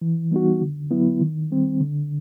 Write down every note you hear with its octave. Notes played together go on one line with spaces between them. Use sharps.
E3
G3 B3 D#4 F#4
D3
F#3 B3 E4
D#3
G3 C4
D3